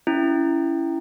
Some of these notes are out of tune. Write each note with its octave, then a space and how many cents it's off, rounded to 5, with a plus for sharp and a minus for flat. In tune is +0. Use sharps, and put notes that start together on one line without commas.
C#4 +15 E4 +15